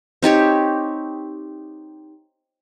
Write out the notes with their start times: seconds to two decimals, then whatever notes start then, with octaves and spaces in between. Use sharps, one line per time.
0.22 C4 D#4 G4 C#5